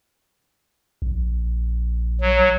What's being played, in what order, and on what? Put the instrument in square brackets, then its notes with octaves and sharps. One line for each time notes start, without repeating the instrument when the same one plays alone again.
[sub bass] A#1
[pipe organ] F#3